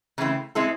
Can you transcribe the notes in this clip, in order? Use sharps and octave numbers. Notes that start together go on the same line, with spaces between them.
C#3 E3 A3 C4 E4
G#3 C4 E4 A4